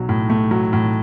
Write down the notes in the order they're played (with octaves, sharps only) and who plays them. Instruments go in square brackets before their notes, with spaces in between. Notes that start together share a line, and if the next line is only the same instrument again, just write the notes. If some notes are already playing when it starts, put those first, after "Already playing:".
Already playing: [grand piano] B1 F#3
A2
A3
F#3
A2